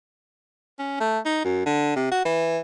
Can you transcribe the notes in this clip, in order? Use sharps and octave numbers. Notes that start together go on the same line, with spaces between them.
C#4
A3
D#4
F#2
D3
C3
F#4
E3